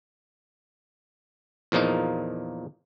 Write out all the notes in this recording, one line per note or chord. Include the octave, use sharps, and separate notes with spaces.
E2 A#2 F3 A#3 D#4